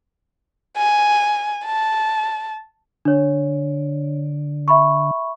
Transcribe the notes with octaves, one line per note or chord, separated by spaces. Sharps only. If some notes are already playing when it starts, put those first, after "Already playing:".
G#5
A5
D3 D4 C#5
E5 B5 C#6